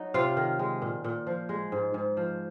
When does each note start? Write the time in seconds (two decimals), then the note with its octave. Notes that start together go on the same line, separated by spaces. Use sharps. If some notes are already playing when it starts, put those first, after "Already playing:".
Already playing: F#3 D#4
0.14 C3 F4 F5
0.37 D#3
0.59 G#3
0.82 A#2
1.04 A#2
1.27 F3
1.49 G#3
1.72 G#2
1.94 G#2
2.17 F3